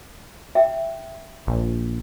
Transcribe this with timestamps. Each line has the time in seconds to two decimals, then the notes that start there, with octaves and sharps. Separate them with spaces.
0.55 E5 G5
1.47 A#1